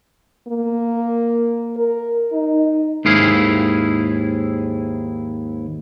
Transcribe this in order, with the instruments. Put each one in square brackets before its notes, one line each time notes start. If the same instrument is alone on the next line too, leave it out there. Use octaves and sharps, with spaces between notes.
[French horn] A#3
A#4
D#4
[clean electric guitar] D#2 G#2 E4 G#4 F5